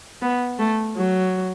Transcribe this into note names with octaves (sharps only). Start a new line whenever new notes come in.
B3
A3
F#3